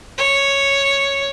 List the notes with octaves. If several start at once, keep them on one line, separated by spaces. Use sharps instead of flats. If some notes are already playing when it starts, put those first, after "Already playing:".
C#5